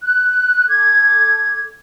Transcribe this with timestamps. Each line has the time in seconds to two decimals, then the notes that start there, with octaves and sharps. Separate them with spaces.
0.01 F#6
0.68 A4 D6 G#6